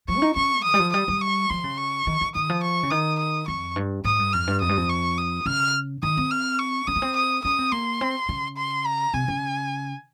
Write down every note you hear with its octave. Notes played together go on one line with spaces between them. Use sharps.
F3 C#6
C#4
D#4
C#4 C#6
D#3 D#6
G3
F3
G3 D#6
G3
C#6
F3 C6
C#3
C#6
D#3
D#3
D#3 D#6
F3
C#6
C#3
D#3 D#6
D#6
F2 C#6
G2
G#2 D#6
G2
F2 F6
G2
F2 D#6
G2
F2
C#6
D#6
C#3 F6
D#3 D#6
C4
F6
C#6
C#4 D#6
A#3
C4
D#6
C#4 D#6
C4
A#3 C6
C4
C#3
C6
A#5
C3 G#5
C#3